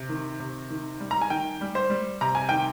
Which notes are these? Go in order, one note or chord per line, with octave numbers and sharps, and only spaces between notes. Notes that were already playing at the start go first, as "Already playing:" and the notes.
Already playing: C3
D#3
C3
D#3
G3
A#5
G#5
D#3 G5
G3
C5
G3
C3 A#5
G#5
D#3 G5